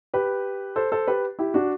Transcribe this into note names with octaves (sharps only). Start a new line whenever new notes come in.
G4 B4
A4 C5
A4 C5
G4 B4
E4 G4
D4 F#4